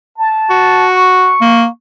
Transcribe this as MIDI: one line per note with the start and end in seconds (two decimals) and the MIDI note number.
0.17 0.90 81
0.50 1.33 66
0.90 1.67 85
1.41 1.66 58